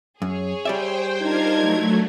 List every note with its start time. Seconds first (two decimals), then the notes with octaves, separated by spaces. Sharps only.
0.22 F#2 G#4 C#5
0.65 G3 C5 D5 E5 G5
1.21 D4 D#4 F4 A#4 C5 G#6
1.60 F#3 A3